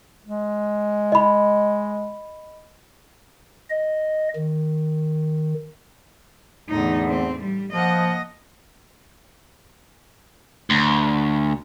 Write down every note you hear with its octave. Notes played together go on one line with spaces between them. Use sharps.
G#3
D#5 B5
D#5
D#3
E2 A2 D3 E3 D#4
C4
G3
F3 A#3 D#5 F#5
D2